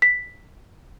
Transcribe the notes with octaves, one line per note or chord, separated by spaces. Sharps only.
B6